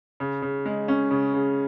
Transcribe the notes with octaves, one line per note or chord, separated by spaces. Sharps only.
C#3
C#3
G#3
C#4
C#3
C#3